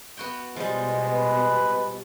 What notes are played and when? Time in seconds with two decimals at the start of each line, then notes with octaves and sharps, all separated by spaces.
0.17 B3 F#4 G5
0.56 B2 F3 G3 G#3
1.08 B4